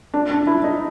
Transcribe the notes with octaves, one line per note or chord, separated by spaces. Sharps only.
D4
D4
E4
D#4